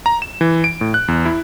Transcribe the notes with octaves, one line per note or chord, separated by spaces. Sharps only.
A#5
E7
E3
D7
A2
F#6
E2
E4